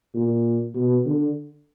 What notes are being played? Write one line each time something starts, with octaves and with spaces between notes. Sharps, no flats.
A#2
B2
D3